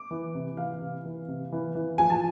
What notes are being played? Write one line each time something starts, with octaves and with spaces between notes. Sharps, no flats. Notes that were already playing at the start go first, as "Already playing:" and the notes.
Already playing: D6
E3
C3
E3 F5
C3
E3
C3
E3
E3
F3 G#5
A5